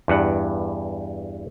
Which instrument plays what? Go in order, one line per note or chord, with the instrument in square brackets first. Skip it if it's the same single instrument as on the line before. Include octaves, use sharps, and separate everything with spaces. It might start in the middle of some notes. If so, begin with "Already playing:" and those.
[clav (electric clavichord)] E2 G2 F#5